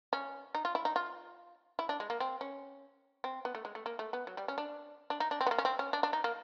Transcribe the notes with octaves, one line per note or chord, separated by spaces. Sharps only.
C#4
D#4
F4
E4
D#4
F4
E4
D4
G#3
A#3
C4
C#4
C4
B3
A3
G#3
A3
A#3
A3
B3
F#3
G3
C#4
D4
D4
D#4
D4
C4
B3
A#3
C#4
C4
C#4
D4
D4
D#4
A#3